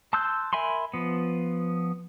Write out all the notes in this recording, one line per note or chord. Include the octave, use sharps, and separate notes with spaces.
A5 C6 E6 F#6 G6
A#4 E5 G#5 B5 C6
F3 B3